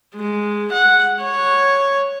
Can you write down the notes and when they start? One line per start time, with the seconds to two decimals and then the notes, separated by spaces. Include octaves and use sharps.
0.16 G#3
0.72 F#5
1.23 C#5